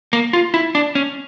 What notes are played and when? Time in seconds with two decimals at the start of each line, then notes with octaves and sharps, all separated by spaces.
0.13 A#3
0.33 F4
0.54 E4
0.75 D4
0.95 C#4